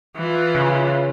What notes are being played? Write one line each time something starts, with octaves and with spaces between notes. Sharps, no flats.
E3 F4
C#3